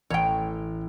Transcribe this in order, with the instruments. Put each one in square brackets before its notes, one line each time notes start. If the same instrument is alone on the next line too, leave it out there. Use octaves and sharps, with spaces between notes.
[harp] A1 [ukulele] C#5 G5